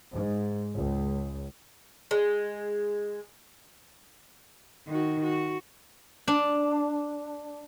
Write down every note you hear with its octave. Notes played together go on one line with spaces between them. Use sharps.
G#2
C#2
G#3
D#3 F#4
F#4
D4